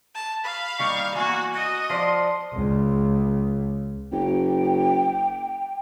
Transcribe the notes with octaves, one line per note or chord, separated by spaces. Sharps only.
A5
F5 B5
D#3 G3 A#3 C#6
E3 A#3 F#4
F#4 D#5
F3 C5 D5 C6
C#2
F#1 G5